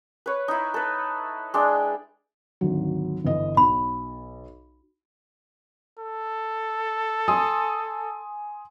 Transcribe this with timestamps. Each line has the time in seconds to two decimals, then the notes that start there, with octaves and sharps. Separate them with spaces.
0.26 B4 C#5
0.48 D#4 E4
0.74 A4 B4
1.54 G#3 D4 G5
2.61 G#1 D2 F#3
3.25 G1 E3 D#5
3.57 B1 B5
5.99 A4
7.28 G#5 C6 D#6